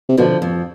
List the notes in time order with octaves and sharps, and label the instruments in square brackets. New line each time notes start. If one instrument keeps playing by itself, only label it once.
[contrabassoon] C3
[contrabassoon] B2 [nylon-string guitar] D3 F3
[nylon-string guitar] F2